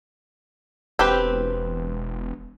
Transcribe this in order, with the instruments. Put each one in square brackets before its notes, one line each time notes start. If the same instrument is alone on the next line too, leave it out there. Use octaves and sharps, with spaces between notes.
[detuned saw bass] E1 [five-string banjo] C4 G4 B4